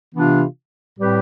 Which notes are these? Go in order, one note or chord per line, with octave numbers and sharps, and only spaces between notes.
C3 E3 B3 D4 F4
A2 G3 C4 G4 B4